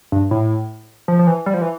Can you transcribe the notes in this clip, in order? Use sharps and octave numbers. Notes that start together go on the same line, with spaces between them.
G2
A2
F3
F3
E3
G3
F3
E3